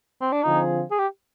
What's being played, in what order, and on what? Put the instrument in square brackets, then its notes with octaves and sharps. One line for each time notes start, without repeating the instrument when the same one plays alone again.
[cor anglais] C4
D4
[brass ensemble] D3 F3 C4 F4 G#4 [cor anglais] D#4
[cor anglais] G#4
G4